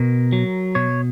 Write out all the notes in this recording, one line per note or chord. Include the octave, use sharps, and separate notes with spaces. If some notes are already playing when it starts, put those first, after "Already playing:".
Already playing: B2 A#4
F#3
B2 C#5